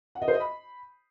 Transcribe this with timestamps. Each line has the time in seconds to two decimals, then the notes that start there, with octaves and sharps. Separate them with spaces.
0.15 F#5
0.22 D#5
0.28 C5
0.34 D#5
0.40 B5